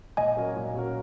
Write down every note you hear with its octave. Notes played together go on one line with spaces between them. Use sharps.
A#2 D#5 G#5
F#3 C#4 F#4 A#4
A#2
F#3 C#4 F#4 A#4